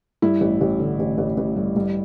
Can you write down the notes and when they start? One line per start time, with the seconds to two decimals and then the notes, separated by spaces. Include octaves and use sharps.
0.22 G2 E4
0.41 A1
0.61 A1
0.80 D3
0.99 A1
1.18 A1
1.38 A1
1.56 G2
1.76 G2